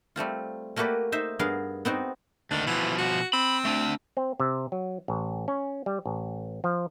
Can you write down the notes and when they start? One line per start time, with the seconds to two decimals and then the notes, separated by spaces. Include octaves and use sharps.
0.16 G3 A3 C4 F4
0.76 A3 A#3 F#4 G4 B4 D5
1.12 D#4 C5 E5
1.39 G2 B3 G#4 A#4 F5
1.85 B3 C4 D#4 F#4
2.51 D2 D#3 D4
2.67 B2 E3 F3
2.98 F#4
3.33 C4 B5
3.65 A3 D4
4.17 C4
4.40 C3
4.72 F#3
5.08 A1
5.48 C#4
5.86 G3
6.06 A1
6.64 F3